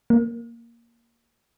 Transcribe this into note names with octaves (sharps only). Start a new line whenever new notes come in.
A#3